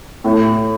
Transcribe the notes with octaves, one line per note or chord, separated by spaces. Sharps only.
A2